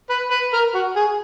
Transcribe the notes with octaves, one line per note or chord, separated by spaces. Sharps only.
B4
B4
A#4
F#4
G#4